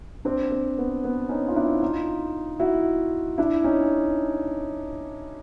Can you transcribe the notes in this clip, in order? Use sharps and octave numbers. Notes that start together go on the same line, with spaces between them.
C4 D4
C4
B3
B3
C#4 D#4
F4
D4 E4
D#4 F4
E4 F#4
D4 E4
C#4 D#4